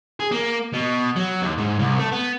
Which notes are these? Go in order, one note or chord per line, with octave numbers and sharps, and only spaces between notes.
G#4
A#3
B2
F#3
D#2
G#2
C2
A3
B3